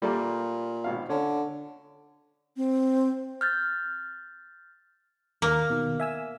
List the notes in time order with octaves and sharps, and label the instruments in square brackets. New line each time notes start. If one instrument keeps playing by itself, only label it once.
[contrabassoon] A#2 [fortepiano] G3 A3 A#3
[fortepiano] G#1 B2 F5
[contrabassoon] D3 [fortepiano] C#4
[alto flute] C4
[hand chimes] F6 G6 A6
[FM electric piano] D#2 [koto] A#3
[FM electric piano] B2 D#3
E5 G#5 E6